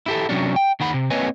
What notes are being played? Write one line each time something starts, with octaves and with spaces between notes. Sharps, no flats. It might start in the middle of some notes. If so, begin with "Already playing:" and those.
E4 G4 A4
C3 F#3 C#4 D4
G5
D#2 D#3 F#5 B5
C3
A#3 C4 B4 C#5 D#5 G#5